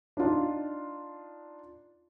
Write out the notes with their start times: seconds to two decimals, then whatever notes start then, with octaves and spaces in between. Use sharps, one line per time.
0.17 D4 D#4 F4